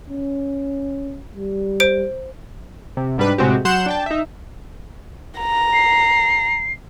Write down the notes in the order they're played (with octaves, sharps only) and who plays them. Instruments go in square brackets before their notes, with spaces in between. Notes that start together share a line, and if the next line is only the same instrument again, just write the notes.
[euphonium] C#4
G3
[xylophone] C5 D7
[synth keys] C3
G#2 G3 D4 B4
A2 C3 G#3 C4 F#4 G4
F#3 F#5 C6 G6 E7
D4 G5 A5
D#4 E5
[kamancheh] A#5
[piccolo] C7